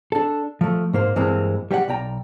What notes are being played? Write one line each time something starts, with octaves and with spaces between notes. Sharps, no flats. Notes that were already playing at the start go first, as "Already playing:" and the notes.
D4 A4
F3 A3
G#2 A#3 C5
G2 E3 G#3 A#3 C4
G3 G4 C#5 F#5
B1 D5 G5 A#5